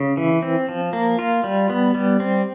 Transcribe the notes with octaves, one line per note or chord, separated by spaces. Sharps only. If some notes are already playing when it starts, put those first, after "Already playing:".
Already playing: C#3
E3
C4
F3
A#3
F4
G3
B3
G3
C4